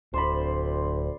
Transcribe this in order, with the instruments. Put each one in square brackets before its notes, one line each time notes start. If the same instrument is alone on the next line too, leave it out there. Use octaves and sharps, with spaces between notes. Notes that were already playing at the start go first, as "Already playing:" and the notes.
[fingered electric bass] D1 [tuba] D2 [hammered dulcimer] C5 D5 B5